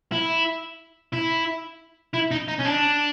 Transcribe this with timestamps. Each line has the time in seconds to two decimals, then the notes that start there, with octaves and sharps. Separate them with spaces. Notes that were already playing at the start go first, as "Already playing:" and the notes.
0.12 E4
1.13 E4
2.14 E4
2.31 D#4
2.48 D#4
2.59 C#4
2.65 D4